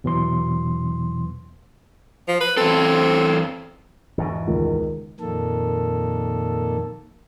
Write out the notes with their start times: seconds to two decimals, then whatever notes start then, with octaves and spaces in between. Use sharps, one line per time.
0.04 E2 B2 E3 F#3 C6
2.28 F3
2.41 B4
2.57 E2 C4 A4
4.18 E2 G#2 B2
4.47 C#2 D#3 A#4
5.20 F2 A#2 D#3 A#3 A4